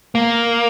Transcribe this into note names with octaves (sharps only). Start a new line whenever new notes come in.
A#3